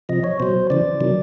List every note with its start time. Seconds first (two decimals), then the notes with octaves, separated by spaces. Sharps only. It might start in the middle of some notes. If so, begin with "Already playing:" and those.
0.09 C3 F3 D#5
0.24 C#5
0.40 B2 F#3 C5
0.70 C#3 E3 D5
1.00 C3 D#3 F#3